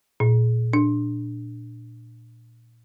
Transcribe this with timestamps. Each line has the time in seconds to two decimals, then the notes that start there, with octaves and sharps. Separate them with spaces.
0.20 A#2
0.73 D4